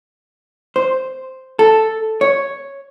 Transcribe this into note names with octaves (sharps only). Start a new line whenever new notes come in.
C5
A4
C#5